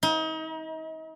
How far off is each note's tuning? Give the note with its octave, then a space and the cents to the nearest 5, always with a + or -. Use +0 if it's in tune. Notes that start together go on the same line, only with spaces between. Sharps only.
D#4 +35